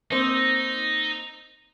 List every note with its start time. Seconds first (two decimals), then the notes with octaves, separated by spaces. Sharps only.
0.11 A#3 C4 D#4